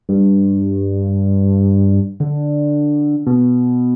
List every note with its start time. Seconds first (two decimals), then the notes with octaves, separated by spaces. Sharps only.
0.09 G2
2.20 D3
3.26 B2